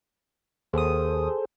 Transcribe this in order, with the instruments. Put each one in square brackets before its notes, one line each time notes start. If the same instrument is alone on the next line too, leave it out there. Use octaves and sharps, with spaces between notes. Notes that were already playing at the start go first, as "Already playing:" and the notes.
[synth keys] D#2 D#6 [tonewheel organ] G#4 A4 C5